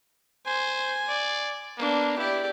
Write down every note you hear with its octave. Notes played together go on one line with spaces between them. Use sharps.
C5 G#5
D5
A#3 B3 D4
E4 G4 D5